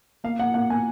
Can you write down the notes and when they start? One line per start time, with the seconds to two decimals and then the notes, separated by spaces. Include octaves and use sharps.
0.24 A#3 F5
0.39 A#3 F#5
0.54 A#3 F#5
0.70 A#3 G#5